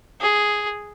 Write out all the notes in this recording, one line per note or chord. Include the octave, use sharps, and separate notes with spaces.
G#4